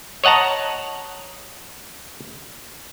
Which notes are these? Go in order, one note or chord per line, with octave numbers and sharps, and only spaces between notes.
C#5 D#5 F#5 A5 A#5